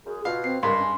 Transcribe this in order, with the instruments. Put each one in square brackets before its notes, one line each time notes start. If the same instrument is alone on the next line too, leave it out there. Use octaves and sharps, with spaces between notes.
[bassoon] F#2 [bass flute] G#4
[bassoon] B2 [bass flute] F4 [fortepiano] F5
[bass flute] C4 [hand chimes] C7
[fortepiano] G2 [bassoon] G#3 [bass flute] A#4 [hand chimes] C6
[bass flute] C#4